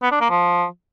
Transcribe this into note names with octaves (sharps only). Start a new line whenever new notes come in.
B3
D4
A#3
F3